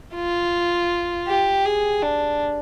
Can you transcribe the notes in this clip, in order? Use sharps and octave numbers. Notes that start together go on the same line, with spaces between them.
F4
G4
G#4
D4